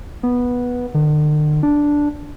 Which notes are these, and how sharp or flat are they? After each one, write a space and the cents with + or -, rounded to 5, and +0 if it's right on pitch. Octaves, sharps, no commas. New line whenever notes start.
B3 -10
D3 +45
D4 -5